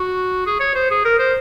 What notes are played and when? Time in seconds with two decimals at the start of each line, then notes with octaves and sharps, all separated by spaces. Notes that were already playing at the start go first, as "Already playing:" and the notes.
Already playing: F#4
0.46 G#4
0.60 C#5
0.75 C5
0.90 G#4
1.05 A#4
1.19 C5